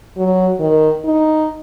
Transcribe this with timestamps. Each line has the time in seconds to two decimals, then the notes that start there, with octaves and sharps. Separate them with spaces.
0.17 F#3
0.60 D#3
1.05 D#4